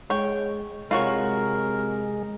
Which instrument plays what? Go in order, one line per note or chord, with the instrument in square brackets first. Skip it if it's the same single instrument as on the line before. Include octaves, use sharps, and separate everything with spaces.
[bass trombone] G#3 [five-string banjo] C#5 G5
[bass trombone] C3 [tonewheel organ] G#3 [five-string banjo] F4 F#4 C#5 [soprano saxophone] A#4